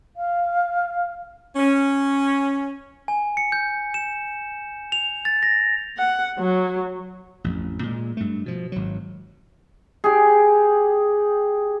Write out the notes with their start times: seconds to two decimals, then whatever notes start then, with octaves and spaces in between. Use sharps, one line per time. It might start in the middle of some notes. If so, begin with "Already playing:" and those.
0.16 F5
1.56 C#4
3.08 G#5
3.37 C#7
3.52 G6
3.94 E7
4.92 F7
5.25 A6
5.43 A#6
5.98 F#5
6.39 F#3
7.44 A1 F2
7.83 A#2 G#3
8.17 G2 A3
8.46 B2 F3
8.72 G#1 F#3
10.04 G4 G#4